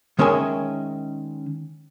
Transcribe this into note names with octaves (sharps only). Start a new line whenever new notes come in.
D#3 G#3 C#4 A#4 E5 G#5